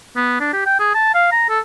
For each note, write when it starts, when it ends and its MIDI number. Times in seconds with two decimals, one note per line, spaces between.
0.16 0.37 59
0.40 0.51 62
0.53 0.64 67
0.66 0.77 79
0.80 0.90 68
0.95 1.10 81
1.15 1.27 77
1.32 1.47 82
1.50 1.60 69